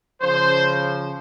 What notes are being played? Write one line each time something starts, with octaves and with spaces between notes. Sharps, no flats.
C#3 F3 C5